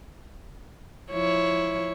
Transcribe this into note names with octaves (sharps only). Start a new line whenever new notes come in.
F3 E4 C#5